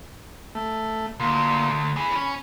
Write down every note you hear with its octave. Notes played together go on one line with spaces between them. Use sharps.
A3
D2 A#2
E3 G#4 B5
C#4